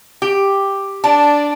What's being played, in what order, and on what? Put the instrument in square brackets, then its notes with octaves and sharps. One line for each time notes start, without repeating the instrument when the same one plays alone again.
[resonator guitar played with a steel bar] G4
[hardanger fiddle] D4 D5 [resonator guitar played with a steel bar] A5